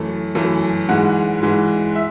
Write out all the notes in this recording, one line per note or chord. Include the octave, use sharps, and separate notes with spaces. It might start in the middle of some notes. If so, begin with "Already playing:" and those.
Already playing: F#2 E3 A3
F#2 E3 A3
G#2 E3 G#3 F#5
G#2 E3 G#3
E5